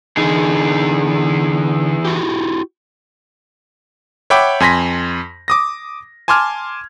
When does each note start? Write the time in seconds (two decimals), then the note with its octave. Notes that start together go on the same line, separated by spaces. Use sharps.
0.17 D3 E3 D#4 G#4
2.05 E4 F#4 G4
4.30 C#5 E5 F#5 G5 B5 D6
4.60 F2 G#5 C6 A#6 B6
5.48 D6 D#6 A#6
6.28 G#5 A5 C6 D6 F6 G#6